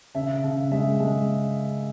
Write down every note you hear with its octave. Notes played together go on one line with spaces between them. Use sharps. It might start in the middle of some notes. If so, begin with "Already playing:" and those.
C#3 E5
C#3
G#3 E5
G#3